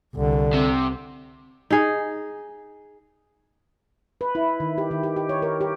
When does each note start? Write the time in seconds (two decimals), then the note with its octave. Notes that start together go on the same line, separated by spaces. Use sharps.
0.16 C2 D3
0.53 C3
1.70 D#4 G#4
4.21 B4
4.35 E4
4.60 D#3
4.78 G4
4.91 D#3
5.03 G4
5.16 G4
5.29 C#5
5.42 A#4
5.61 G4